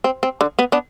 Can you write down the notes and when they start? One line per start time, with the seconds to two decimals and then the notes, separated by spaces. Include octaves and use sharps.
0.04 C4
0.23 C4
0.41 D3
0.59 B3
0.72 B3 D4